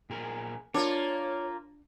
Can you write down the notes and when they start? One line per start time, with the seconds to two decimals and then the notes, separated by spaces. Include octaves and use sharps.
0.10 A#2 G#4 A#4
0.74 A#3 D4 F4 C#5